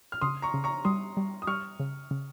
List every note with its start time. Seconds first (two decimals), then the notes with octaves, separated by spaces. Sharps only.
0.12 F6
0.21 C#3 C6 D#6
0.42 A#5 C#6
0.54 C#3
0.64 A#5 C#6
0.85 G3 C6 D#6
1.17 G3
1.42 D#6
1.47 G3 C#6 F6
1.80 C#3
2.11 C#3